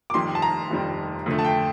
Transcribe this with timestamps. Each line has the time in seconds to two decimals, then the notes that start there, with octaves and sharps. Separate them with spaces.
0.10 D6
0.14 F1 F2 D#3 G3 C6
0.35 A5
0.42 A#5
0.70 F1 F2 D#3 G3
1.26 F2 D3 A3
1.39 A5
1.45 G5